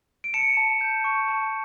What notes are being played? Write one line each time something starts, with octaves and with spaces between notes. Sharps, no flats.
D7
A5 C#7 E7
A5
G6
C#6
A5